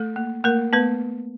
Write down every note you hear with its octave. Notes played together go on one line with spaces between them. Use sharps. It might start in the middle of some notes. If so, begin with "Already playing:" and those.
Already playing: A3 A4
A#3
A3 A#3 A#4
A3 B3 B4